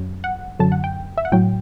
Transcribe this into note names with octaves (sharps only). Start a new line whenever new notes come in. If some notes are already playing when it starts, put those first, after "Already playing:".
Already playing: F#2 F#3
F#5
F#2 D3 F#3 A5
F#5
G5
E5
F#5
A2 F#3 G5